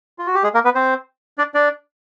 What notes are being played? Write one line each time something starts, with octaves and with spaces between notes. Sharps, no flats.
F4
F#4
G4
G#3 G#4
A#3 A#4
B3 B4
C4 C5
D4 D5
D4 D5